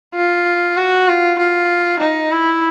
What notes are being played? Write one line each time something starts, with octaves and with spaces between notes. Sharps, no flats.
F4
F#4
F4
F4
D#4
E4